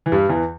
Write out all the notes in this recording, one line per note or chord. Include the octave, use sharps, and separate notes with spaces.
E3
G2 G3
E2 E3